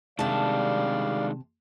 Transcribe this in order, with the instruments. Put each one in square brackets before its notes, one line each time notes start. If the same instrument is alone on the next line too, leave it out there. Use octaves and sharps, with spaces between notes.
[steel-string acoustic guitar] C3 A5 [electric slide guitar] D#3 G#3 D4 [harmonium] G3 D5 F5